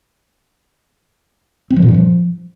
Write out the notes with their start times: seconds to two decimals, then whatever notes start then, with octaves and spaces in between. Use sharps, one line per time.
1.70 C4
1.76 F3
1.82 A#2
1.88 G2
1.94 F3